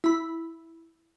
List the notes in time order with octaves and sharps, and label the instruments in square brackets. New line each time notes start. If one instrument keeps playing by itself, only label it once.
[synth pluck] E4 B5